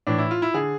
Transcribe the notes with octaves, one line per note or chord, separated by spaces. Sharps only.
A2 E3 D4
E4
F4
E4
D3 G#4